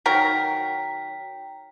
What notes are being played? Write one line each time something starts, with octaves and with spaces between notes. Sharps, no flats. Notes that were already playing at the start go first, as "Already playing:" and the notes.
D#3 F#3 A#4 G5 A#5 B6